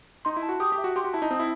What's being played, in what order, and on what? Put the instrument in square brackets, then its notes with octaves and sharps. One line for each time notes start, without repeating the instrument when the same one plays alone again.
[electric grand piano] D#4 [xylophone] C6
[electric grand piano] E4
[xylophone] A5
[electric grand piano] F#4
[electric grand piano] G4 [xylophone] D#6
[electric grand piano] G4
[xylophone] E5
[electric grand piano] F#4
[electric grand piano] G4 [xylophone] C6
[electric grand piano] F#4
[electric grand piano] E4 [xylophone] A5
[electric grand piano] D#4
[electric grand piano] C4 [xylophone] D#6
[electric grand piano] E4